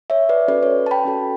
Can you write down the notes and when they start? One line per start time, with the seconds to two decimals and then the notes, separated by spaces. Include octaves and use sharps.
0.10 C#5 E5
0.29 B4 D5
0.48 C#4 F#4 A4 B4 D5
0.63 C#5
0.86 A5
0.91 G5 B5
1.05 C#4 F#4 A4